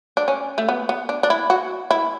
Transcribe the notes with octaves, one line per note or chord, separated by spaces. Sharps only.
D4
C#4
A3
B3
B3
D4
D4
E4
F#4
E4